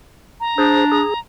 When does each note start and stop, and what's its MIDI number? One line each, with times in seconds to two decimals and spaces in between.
0.40 1.19 82
0.58 1.03 62
0.58 0.85 68
0.58 0.85 72
0.92 1.14 68